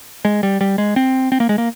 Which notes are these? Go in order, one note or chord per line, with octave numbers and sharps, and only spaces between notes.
G#3
G3
G3
G#3
C4
C4
A#3
G#3
A#3